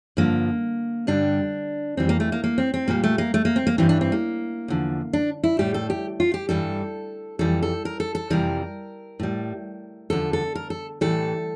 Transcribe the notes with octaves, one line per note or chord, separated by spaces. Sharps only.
G2 D3 F3 A#3
G2 D3 G3 D4
F2 E3 G3 C4
A#3
A3
A#3
A#3
C4
C4
A#2 G3 A#3
A3
A#3
A3
A#3
C4
A#3
G2 E3 G3 C4
D4
C4
A#3
E2 D3 F3
D4
E4
A2 G3 G4
A4
G4
F4
G4
G2 E3 G3 A4
F2 E3 G3 A4
A4
A#4
A4
A4
F2 C3 E3 G3 A#4
A2 G3
E2 D3 F3 A4
A4
A#4
A4
A2 E3 G3 A4